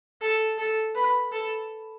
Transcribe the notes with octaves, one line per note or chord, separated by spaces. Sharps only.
A4
A4
B4
A4